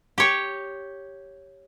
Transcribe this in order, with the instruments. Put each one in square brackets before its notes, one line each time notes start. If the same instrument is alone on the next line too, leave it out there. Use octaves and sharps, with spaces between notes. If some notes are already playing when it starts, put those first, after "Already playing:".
[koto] G4 C#5